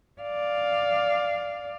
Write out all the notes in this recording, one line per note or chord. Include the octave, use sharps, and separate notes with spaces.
D5 F5